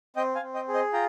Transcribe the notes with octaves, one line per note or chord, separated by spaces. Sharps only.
C4 D#5 G5
F5 G#5
C4
D#5 G5
G#4
C5 D#5
F4 G5 A#5